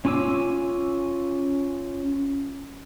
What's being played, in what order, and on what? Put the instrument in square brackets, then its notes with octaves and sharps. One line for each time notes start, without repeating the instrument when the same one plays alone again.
[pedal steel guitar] C#4 F4 G#5 D6 E6